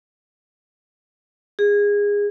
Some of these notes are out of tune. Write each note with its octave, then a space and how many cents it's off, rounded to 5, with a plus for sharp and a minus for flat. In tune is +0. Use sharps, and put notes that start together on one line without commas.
G#4 -20